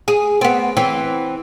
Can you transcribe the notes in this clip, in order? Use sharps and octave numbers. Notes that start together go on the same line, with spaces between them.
G#4
B3 C4
E3 C4